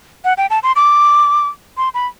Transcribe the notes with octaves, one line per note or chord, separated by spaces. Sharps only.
F#5
G5
A5
C6
D6
C6
B5